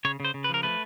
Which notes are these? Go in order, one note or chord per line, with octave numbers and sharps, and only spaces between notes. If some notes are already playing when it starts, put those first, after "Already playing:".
C#3 C#5
C#3 C5
C#3
B4
F3 A#4
A3 B4